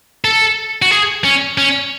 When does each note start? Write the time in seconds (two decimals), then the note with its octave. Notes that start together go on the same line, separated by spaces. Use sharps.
0.25 A4
0.82 F#4
0.91 G#4
1.24 C#4
1.58 C#4